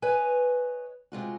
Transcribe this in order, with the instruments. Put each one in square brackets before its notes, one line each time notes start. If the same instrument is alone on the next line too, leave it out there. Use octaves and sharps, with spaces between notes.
[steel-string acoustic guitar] B4 C#5 D#5 G#5
C3 G#3 F4 F#4